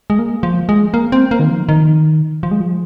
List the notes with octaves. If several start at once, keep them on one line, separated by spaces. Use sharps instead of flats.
G#3
A#3
F3
G#3
A#3
C4
A#3
D#3
F3
D#3
F3
G#3
F3